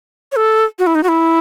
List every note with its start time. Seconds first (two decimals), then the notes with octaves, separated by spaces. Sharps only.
0.32 C#5
0.36 A4
0.79 F#4
0.87 E4
0.95 D#4
1.03 F#4
1.08 E4